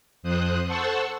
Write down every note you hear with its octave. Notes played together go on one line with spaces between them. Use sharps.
F2 C5 D#6 F#6
A4 C5 F#5 A5 C#6 E6